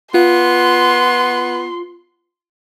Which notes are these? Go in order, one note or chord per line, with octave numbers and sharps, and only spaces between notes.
B3 F4 C6